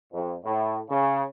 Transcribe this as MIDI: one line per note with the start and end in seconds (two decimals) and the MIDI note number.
0.13 0.35 41
0.45 0.79 45
0.90 1.24 49